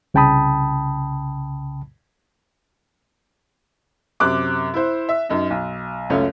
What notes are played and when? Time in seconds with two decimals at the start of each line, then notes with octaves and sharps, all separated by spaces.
0.14 C2 C#3 G5 A5 B5 D#6
4.20 F#2 C3 D6 F#6
4.74 E4 C5
5.09 E5
5.29 F#2 D#4
5.50 B1
6.10 C#2 F#2 A3 C#4